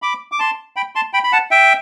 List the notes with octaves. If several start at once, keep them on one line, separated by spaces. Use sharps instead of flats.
B5 D6
D6
A5 C6
G5 B5
A5 C6
G5 B5
B5
F#5 A5
E5 G5